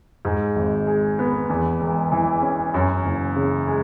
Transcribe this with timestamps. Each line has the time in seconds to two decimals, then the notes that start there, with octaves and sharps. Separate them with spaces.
0.25 G#2
0.56 G#1
0.87 G#3
1.19 B3
1.49 E2
1.81 E1
2.12 E3
2.42 C#4
2.74 F#2
3.05 F#1
3.36 C#3
3.68 G#3